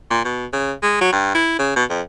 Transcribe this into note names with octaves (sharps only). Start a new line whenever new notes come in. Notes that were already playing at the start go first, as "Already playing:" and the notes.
A#2
B2
C#3
G#3
F#3
G2
E4
C#3
B2
F2